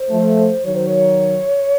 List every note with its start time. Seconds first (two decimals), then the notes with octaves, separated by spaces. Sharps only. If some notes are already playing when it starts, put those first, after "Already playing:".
Already playing: C5
0.10 F3 A3
0.64 D#3 F#3 C#5
0.75 C5
0.87 C#5